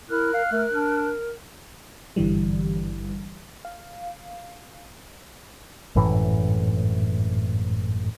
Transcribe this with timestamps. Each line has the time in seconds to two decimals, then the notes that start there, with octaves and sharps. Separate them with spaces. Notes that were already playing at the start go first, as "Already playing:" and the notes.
0.10 E4 A#4 F6 F#6
0.34 F5
0.52 A3 A#4
0.70 D4
2.16 G#1 G2 D3 E3 G3
3.65 F5
5.95 G#1 F#2 A2 E3